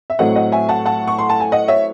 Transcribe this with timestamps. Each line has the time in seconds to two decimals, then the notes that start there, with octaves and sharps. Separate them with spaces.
0.10 E5
0.19 A2 F#3 A3 C4 D#5 F#5
0.36 D#5 F#5
0.52 E5 G#5
0.69 F#5 A5
0.86 F#5 A5
1.07 C#6
1.18 C6
1.29 A5
1.40 G#5
1.52 D#5 F#5
1.68 C#5 E5